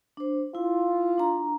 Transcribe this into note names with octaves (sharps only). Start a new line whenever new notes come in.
D4 C5
E4 F4
D4 A#5